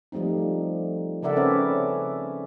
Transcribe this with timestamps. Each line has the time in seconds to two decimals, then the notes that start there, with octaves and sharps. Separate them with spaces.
0.12 F3 G3 A3 C4 D#4
1.22 C#3 A4 A#4 D5 E5 F#5
1.36 C4 C#4 G#4 A4 B4 C#5